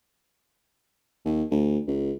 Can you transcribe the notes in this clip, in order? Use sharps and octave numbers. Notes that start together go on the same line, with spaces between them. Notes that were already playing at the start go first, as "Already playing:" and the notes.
D#2
D2
C#2